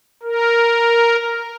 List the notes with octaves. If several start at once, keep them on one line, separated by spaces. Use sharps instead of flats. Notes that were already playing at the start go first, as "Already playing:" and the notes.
A#4